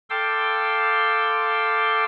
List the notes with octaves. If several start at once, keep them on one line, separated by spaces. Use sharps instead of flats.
A4 F5 G5 C6 D6 E6